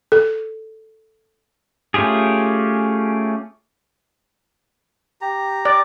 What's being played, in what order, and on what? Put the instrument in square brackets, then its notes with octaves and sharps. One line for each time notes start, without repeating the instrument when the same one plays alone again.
[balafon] A4
[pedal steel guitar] A3 C#4 F4 G4 G#4
[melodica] G4 A#5
[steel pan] D5